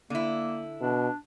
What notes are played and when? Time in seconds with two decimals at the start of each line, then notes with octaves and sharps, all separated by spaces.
0.10 D3 A#3 E4
0.81 B2 D4